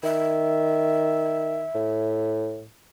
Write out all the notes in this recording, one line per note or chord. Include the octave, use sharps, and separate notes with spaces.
D#3 E5
A2